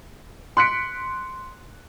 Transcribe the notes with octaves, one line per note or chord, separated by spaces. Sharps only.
C6 F#6 B6 C#7 D7